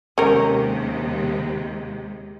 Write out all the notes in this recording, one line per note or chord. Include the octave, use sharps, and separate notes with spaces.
D#2 C3 G#3 C#4 A#4